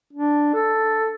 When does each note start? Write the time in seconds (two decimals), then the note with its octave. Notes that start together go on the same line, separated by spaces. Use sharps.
0.13 D4
0.54 A4